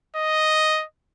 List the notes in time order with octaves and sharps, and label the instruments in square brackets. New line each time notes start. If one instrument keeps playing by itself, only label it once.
[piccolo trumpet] D#5